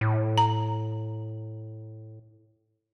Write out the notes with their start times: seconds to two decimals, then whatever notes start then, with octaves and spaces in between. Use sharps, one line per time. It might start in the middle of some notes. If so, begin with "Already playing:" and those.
0.01 A2
0.38 A#5